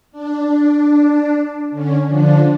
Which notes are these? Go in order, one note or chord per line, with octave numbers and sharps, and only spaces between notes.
D4
D3 C#4
D3 F3 D4